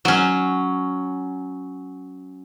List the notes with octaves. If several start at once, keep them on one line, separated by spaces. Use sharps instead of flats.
F#3 C#4